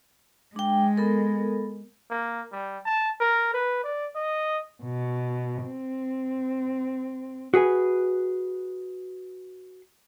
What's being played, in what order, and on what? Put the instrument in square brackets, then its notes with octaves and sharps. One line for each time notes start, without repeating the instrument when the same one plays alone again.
[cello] G#3 [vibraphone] D4 G5
[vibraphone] B3 A4 A#4
[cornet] A#3
G3
A5
A#4
B4
D5
D#5
[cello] B2
C4
[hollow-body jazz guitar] F#4 G#4 B4 G#5